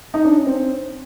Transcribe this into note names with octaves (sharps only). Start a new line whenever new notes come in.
D#4
D4
C#4
C4